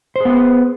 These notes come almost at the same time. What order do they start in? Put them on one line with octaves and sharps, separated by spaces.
C5 G#4 B3 B4